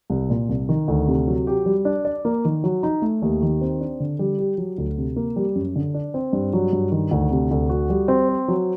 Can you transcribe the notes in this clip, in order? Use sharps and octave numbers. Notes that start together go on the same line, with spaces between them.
C2
A#2
C2
D#3
D2
C3
F#3
G4
G3
D4
D5
A#3
D#3
F#3
D#4
A3
D#2
D#3
C4
D4
D3
G3
G4
F#3
D2
C3
A#3
G3
F#2
D3
D4
C4
G2
F#3
G2
D#3
D2
C3
D2
F#4
G3
C4
C5
F#3